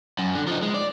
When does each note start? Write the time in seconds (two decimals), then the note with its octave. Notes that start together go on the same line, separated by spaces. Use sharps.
0.19 F#2
0.35 D3
0.47 F3 D#4
0.63 G#3
0.74 D5